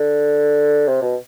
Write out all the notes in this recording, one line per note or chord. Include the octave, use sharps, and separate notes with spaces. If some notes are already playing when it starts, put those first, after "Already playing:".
Already playing: D3
C3
B2